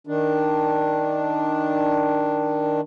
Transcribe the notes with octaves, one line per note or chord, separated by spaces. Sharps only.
D#3 D4